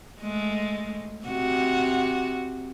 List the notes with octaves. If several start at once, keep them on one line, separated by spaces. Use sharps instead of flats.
G#3 A3
C3 F#4